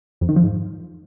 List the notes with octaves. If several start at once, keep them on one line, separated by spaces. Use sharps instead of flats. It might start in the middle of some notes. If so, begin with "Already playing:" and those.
F2
D#3
F3
G#2